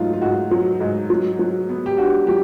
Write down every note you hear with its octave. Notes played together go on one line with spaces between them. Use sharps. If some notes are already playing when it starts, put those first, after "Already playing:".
Already playing: G#2 F#3 A3 D#4 F4
F4
G#2 F#4
F#3
G#2
F#3
F#3
B3
G4
D4 F#4
F#3 G4